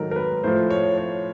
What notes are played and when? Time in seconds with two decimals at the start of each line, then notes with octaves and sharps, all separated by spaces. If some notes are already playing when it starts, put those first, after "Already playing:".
Already playing: G#2 D#3 F#3 A4 A#4
0.11 A#4
0.16 B4
0.43 A2 F3 C5
0.70 C#5
0.98 C#5